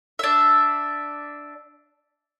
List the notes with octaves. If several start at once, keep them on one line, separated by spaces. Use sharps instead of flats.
D4 E5